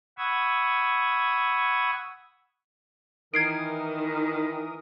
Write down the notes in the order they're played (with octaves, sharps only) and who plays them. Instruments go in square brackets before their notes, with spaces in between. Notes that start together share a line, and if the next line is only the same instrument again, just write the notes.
[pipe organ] F#5 B5 C#6 D#6 E6 G#6
[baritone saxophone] D#3 [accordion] E3 A#4 D#6 [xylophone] G#6 C7 D7